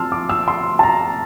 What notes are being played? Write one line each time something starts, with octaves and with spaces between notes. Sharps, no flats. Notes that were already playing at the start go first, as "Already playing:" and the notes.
Already playing: F3 C4 A5 C6 E6 F6
D6
E6
C6
A5
A#5